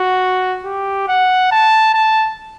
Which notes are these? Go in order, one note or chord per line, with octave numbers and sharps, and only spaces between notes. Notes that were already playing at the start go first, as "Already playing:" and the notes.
Already playing: F#4
G4
F#5
A5
A5